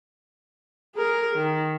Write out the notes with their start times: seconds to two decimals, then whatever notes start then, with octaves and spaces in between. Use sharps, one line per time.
0.96 G#4 A#4
1.36 D#3